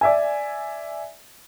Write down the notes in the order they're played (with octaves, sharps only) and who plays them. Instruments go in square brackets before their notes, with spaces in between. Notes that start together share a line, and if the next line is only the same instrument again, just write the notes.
[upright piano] D5 E5 G#5